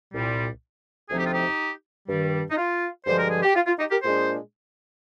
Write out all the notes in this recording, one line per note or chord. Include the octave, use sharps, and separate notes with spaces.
C2 A#2 G3
D2 C3 F3 C4 D#4 G#4
G4
F4
D#4 G4
G2 D#3 G3
D#4
F4
G2 D3 F3 G#3 C5
A#4
G#4
G4
F4
F4
D#4 G4
G4 A#4
A#2 G#3 D4 G#4 C5